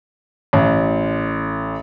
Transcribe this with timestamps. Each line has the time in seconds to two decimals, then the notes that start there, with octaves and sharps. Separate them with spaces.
0.53 A1